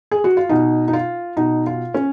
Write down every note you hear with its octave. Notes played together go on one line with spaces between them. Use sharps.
G#4
F#4
F4
B2 D#4
D#4
F4
B2 D#4
F4
C#4